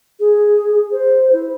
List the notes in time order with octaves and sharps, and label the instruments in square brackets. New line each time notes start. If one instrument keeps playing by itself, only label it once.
[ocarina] G#4
C5
E4